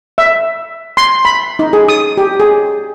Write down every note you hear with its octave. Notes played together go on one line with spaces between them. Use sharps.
E5
C6
B5
D#4
G#4
D#6
G4
G#4